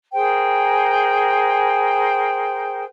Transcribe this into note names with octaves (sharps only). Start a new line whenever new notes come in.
G#4 A#4 C5 G5